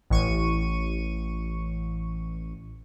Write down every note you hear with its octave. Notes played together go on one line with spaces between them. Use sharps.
A1 C#6 D#7